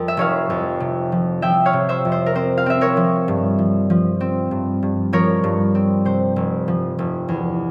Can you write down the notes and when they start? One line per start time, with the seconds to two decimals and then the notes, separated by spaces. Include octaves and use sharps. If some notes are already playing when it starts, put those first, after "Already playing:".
Already playing: F2 A#4
0.08 E5
0.17 F1 C#5 F5
0.50 F2
0.80 C3
1.12 F3
1.42 F3 E5 G5
1.66 C#5 F5
1.73 C3
1.89 C5 E5
2.05 F2
2.12 C5
2.26 A#4
2.35 C4 C5
2.57 F5
2.66 C4 E5
2.81 A#4 C#5
2.97 F3
3.28 G2
3.58 F3
3.90 F3
4.21 C4
4.51 G2
4.83 G2
5.13 F3 A#4 C#5
5.44 G2
5.75 C4
6.05 C3 C5
6.36 F1
6.68 F3
6.99 F1
7.29 E2